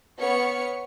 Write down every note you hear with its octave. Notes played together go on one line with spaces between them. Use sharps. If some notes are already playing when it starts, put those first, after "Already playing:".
B3 C#5 C#6 F6 C#7